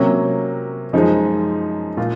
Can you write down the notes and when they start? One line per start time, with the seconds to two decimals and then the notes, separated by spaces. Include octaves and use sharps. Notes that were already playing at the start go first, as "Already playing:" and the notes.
Already playing: C3 F#3 A#3 C#4
0.93 F#2 F3 G#3 D#4
1.97 A#2 F4